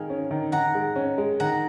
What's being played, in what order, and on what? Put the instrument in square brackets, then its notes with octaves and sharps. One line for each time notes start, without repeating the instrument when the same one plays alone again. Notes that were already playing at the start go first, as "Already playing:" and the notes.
Already playing: [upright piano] D#3 G#3 [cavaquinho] F5 G#5
[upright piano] C#4
D#3
[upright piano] D#3 [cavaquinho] F#5 A#5
[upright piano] G#3
C#4
G#3
[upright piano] D#3 [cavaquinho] F#5 A#5